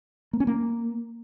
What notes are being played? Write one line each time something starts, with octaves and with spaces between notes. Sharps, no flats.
A#3
C#4
A#3